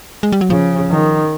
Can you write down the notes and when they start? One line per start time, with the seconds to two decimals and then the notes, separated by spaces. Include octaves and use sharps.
0.23 G#3
0.32 G3
0.41 F#3
0.50 C#3 F3
0.90 D#3